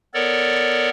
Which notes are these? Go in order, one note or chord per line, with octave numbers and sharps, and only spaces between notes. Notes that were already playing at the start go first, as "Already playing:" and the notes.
B3 A4 A#4 C#5 D5